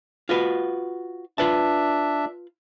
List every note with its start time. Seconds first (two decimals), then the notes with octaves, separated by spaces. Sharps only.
0.29 F4 F#4 B4
1.38 D4 F4 B4 E5 A5